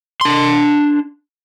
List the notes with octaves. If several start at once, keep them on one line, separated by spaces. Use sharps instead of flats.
D4 C6